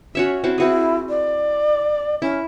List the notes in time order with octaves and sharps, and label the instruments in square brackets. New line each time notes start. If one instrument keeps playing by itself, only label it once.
[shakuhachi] C#4 [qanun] F#4 C#5 E5
[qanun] C4 E4 F#4
[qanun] C4 F#4 G#4 [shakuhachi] E4
[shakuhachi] D5
[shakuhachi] C#4 [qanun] E4